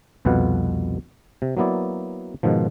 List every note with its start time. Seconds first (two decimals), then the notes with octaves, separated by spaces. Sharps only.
0.25 C2 F2 B2 B4 F5 F#5
1.42 C3
1.57 F#3 A#3 B3 E4 D5
2.43 G#2 B2 D#3 F3